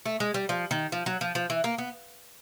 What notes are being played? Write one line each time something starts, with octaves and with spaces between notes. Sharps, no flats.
A3
G#3
G3
F3
D#3
F3
F#3
F3
F3
E3
A#3
B3